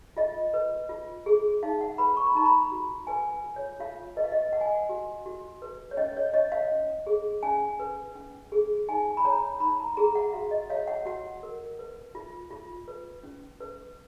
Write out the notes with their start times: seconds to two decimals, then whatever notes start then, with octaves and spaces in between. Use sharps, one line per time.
0.17 F4 D#5
0.54 B4
0.89 F4
1.26 G#4
1.63 D#4 F5
1.81 F#5
1.98 B4 B5
2.17 C#6
2.27 B5
2.35 D#4 A#5
2.46 B5
2.72 F#4
3.07 B4 G#5
3.44 F4
3.56 C#5
3.80 F4 F5
4.17 B4 D#5
4.24 F5
4.32 D#5
4.53 B4 F#5
4.61 G#5
4.68 F#5
4.89 F#4
5.26 F#4
5.62 B4
5.91 C#5
5.97 C#4 D#5
6.17 C#5
6.34 C#5 D#5
6.52 F5
6.71 C#4
7.07 G#4
7.43 C#4 G#5
7.80 B4
8.15 C#4
8.52 G#4
8.88 D#4 G#5
9.17 B5
9.25 C#5 A#5
9.60 D#4 B5
9.79 A#5
9.97 G#4 A#5
10.15 F#5
10.33 F#4 F5
10.51 D#5
10.70 C#5 F5
10.88 F#5
11.06 F#4 F#5
11.43 A#4
11.79 B4
12.15 F4
12.51 F4
12.88 B4
13.24 C#4
13.60 B4